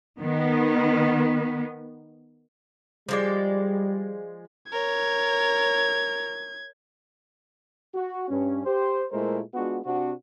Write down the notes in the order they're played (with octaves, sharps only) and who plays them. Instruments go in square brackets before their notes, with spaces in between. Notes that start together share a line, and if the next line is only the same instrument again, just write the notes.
[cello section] D#3 B3
[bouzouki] F3 G#3 D5 [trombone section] G3
[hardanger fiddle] A#4 C#5 [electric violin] G#6
[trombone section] F#4
G2 C#4
G4 C5
A#2 G#3 A3 E4 A#4 C5
G#3 B3 D4 F4 F#4
C3 C4 D4 F#4